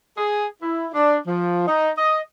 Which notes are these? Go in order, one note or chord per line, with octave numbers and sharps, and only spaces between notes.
G#4
E4
D4
F3
D#4
D#5